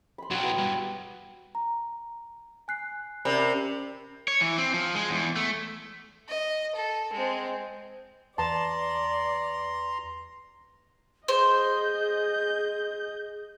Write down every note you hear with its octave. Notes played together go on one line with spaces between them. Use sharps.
B5 C6
B1 F#3 F#4 G5
B3 E4 B5
G2
A#5
G#5 F#6 C7
C3 C#4 A#4 D5 B5
C#5
E3
C4
F3
G#3
E2
A3
D#5
A4
G#3 C4
E2 B4 D5 A5 A#5 C6
G#4 C5 D#5 G6